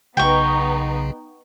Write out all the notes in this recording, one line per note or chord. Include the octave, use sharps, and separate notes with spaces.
B1 C#3 B3 D#4 G5 C#6